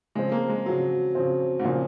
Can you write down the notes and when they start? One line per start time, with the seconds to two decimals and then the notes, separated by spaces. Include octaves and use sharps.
0.15 C#3 F3 G#3 C4
0.32 A#3
0.49 G#3
0.66 C#3 F3 F#3 C4
1.15 C#3 F3 C4
1.59 G#2
1.64 A#2 C#3 F3 C4